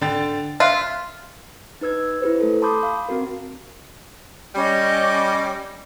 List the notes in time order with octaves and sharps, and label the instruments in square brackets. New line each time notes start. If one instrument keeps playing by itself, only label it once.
[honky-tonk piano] D3 G5 A6
[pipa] F4 [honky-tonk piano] E5 F#6
[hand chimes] D#4 B4 E6 G#6
E4 G4 B4 C5
A3 A4
A5 B5 C6 D6 D#6 G6
F5
C4 F#4 A#4
[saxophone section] G3 [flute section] C#4 D#5 D6